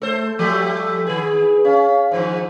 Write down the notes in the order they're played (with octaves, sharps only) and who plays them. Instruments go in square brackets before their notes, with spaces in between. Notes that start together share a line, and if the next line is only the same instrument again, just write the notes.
[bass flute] A3 [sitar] A4 C5
[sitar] F3 G3 A3 [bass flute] A4
[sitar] D#3 G#4 [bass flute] B4
[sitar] C#4 [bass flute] F5
[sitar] G#2 D#3 F3 [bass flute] C5